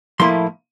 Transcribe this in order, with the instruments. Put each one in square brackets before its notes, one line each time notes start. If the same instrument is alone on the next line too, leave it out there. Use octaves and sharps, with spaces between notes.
[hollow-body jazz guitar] A2 F3 A#3 E4 C6